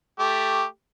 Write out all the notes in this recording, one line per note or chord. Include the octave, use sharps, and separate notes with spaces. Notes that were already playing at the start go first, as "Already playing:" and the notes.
A3 G4